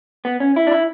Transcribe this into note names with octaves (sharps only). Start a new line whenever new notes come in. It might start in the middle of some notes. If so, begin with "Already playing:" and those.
B3
C#4
E4
D4
E4